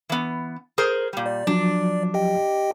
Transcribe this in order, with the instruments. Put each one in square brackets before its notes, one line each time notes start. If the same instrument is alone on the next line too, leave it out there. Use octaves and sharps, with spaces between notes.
[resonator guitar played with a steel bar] E3 B3
G#4 A#4 C5
A#2 G3
[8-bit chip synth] D5
[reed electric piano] F3 F#3 [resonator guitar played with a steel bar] D4
[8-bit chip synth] G4 D#5 G5